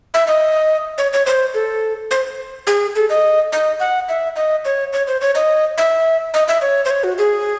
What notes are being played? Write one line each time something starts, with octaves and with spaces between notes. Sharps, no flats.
E5
D#5
C#5
C#5
C5
A4
C5
G#4
A4
D#5
D#5
F#5
E5
D#5
C#5
C#5
C5
C#5
D#5
E5
D#5
E5
C#5
C5
C#5
F#4
G#4